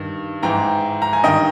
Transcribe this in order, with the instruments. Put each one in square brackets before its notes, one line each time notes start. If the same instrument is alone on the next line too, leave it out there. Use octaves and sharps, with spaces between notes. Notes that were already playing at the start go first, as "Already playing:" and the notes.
Already playing: [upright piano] G2 D#3
G#2 E3 G5 A#5
A#5
G#5
G2 D#3 D#5 G5